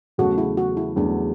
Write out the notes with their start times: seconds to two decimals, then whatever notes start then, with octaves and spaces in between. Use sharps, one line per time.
0.18 E2 C#3 F#3 A3 F#4
0.38 E4
0.57 F#4
0.77 E4
0.96 E2 C#3 F#3 A3 D4